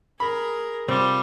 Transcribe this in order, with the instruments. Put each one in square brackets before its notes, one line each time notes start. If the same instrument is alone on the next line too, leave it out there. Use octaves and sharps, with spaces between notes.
[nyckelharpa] G#4 A#4 [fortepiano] B5
[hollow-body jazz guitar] C3 C4 [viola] G3 [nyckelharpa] F4